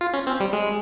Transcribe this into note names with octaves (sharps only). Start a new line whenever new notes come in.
F4
C#4
C4
G3
G#3